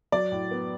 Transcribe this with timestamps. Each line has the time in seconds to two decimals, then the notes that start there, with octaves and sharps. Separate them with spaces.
0.12 F#3 D5
0.32 A2
0.51 B3